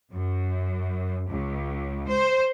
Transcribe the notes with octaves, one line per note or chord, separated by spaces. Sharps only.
F#2
C#2
C5